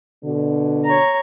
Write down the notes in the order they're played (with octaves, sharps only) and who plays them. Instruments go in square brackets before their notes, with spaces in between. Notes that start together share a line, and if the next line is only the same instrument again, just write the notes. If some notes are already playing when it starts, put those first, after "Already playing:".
[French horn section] B2 D3
[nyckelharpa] C#5 A#5